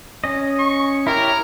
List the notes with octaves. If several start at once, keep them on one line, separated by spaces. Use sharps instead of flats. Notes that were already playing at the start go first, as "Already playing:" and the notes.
C#4 D#5
C#6
E4 G4 A#4 C#5